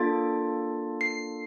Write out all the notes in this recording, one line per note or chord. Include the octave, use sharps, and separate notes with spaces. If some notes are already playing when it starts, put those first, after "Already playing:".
Already playing: A#3 D4 F4 A4 A6
C7